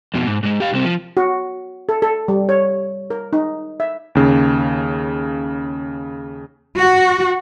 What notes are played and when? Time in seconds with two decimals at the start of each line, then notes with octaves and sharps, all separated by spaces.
0.14 F2 B2
0.27 G#2
0.43 G#2 G#3
0.60 G4 F5
0.73 C2 C4
0.85 F3
1.17 F#4
1.89 A4
2.02 A4
2.28 G3
2.49 C#5
3.10 A#4
3.33 D#4
3.80 E5
4.15 D#2 C#3
6.77 F#4